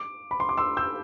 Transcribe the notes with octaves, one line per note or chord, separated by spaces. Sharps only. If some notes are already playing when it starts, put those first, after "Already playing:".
Already playing: D6
B5
C6
D6
C6 E6
E6 G6